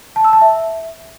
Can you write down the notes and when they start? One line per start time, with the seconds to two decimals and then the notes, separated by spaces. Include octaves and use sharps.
0.16 A5
0.24 E6
0.33 A5
0.42 E5